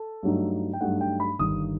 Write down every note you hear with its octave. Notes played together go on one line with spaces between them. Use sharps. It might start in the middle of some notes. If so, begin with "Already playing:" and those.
Already playing: A4
G2 F#3 A3 D#4
G5
G2 F#3 A3 D#4 F#5
G5
B5
G1 G2 D#3 D#6